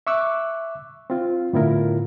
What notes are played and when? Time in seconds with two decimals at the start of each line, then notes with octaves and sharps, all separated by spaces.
0.07 E5 C#6 D6 E6 F#6
1.10 C4 F4
1.53 A2 D3 B3 E4 F4 A#4